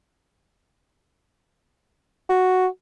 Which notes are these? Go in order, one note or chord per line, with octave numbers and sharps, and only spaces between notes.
F#4